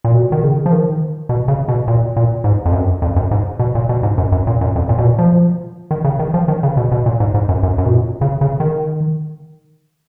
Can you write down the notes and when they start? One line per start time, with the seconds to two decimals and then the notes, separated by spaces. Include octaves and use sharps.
0.04 A#2
0.14 B2
0.32 D#3
0.44 C#3
0.66 F3
0.72 D#3
1.29 B2
1.48 C#3
1.68 B2
1.88 A#2
2.17 A#2
2.44 G#2
2.66 F2
2.73 F#2
3.02 F2
3.16 F#2
3.31 G#2
3.59 B2
3.75 A#2
3.89 B2
4.03 G#2
4.18 F#2
4.32 F#2
4.47 A#2
4.61 F#2
4.76 F2
4.89 A#2
4.98 B2
5.05 A#2
5.19 F3
5.91 D#3
6.04 C#3
6.19 D#3
6.34 F3
6.48 D#3
6.63 C#3
6.77 B2
6.92 B2
7.06 A#2
7.20 G#2
7.34 G#2
7.49 F#2
7.63 F#2
7.78 F#2
7.85 B2
7.92 A#2
8.21 C#3
8.41 C#3
8.60 D#3